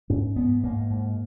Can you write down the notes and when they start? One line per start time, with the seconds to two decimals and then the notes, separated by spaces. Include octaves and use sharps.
0.10 G#2 C#4
0.36 G#2 B3
0.64 G#2 A#3
0.90 G#2